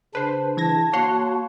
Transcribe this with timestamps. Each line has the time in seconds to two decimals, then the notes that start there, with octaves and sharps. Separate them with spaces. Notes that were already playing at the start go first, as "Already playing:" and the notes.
0.15 C#3 D4 B4 C5
0.57 E3 A5 G#6 A#6
0.93 A#3 F#4 C#5 F#5 C6